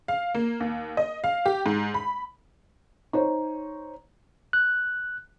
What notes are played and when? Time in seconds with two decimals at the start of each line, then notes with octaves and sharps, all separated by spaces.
0.08 F5
0.35 A#3
0.60 D#2
0.97 D#5
1.24 F5
1.46 G4
1.66 G#2
1.94 B5
3.13 D#4 C5 C#5
4.53 F#6